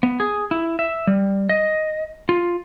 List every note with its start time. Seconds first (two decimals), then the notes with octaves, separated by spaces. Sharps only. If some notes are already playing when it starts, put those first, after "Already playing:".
0.03 B3
0.20 G#4
0.51 E4
0.79 E5
1.07 G3
1.49 D#5
2.29 F4